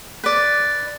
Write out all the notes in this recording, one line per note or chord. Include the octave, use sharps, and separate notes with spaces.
B4 D5